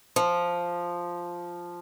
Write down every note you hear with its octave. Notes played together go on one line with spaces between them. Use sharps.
F3